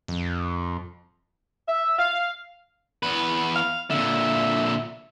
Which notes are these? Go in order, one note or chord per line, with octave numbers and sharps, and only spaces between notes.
F2
E5
F5
E2 B4
F5
A#2 D3 E5